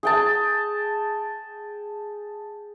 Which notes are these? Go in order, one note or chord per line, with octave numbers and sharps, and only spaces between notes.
G#4 G5 A5